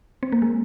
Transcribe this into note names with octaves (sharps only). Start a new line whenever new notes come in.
C4
A#3
G#3